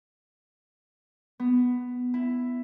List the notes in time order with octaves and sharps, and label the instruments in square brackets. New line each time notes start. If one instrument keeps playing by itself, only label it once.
[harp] B3
E4